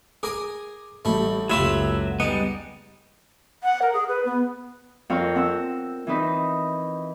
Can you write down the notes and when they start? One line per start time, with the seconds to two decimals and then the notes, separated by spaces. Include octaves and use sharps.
0.23 G#4 A#4 G#5 D6
1.05 A1 G3 A3 E4
1.50 F#1 C#2 F#3 A3 E4 F4 G4 E5
2.20 G3 G#3 B3 D#4
3.63 F#5
3.81 A#4
3.93 G#4
4.08 B4
4.25 B3
5.10 F2 C4 A#4 C#5 F5 F6
5.36 C4 F#5 E6
6.07 E3 C4 D#4 B4 D#5